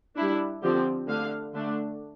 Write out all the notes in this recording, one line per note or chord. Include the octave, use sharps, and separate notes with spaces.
G3 D4 E4
D3 F3 C4 G4
D3 A3 D4 F5
D3 A3 D4